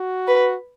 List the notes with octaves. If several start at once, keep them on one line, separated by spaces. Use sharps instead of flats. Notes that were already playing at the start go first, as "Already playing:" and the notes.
Already playing: F#4
B4